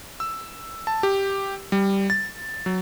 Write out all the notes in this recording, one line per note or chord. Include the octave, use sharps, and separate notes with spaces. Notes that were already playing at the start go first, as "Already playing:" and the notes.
E6
A5
G4
G3
A6
F#3